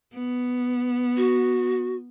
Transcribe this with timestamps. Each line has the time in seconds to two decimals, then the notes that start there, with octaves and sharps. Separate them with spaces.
0.13 B3
1.17 F#4